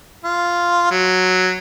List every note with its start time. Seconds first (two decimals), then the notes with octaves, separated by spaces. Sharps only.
0.24 F4
0.91 F#3